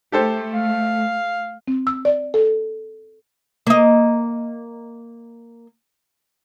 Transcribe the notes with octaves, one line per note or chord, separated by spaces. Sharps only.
A3 G4 A4 C5
F5
C4
E6
D5
A4
A#3 D#5